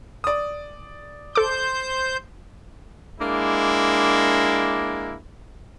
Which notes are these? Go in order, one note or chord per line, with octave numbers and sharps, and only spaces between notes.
D5 D#6
A4 C5 D6 G6
G#3 A#3 D4 E4